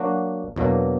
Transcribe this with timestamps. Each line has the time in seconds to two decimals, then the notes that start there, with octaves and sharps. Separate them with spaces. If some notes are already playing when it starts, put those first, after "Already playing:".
Already playing: F#3 A#3 D4 F#4
0.56 E2 B2 F#3 A#3 D4